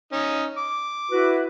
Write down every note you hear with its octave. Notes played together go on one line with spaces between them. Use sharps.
C#4 D#4
D6
E4 F#4 B4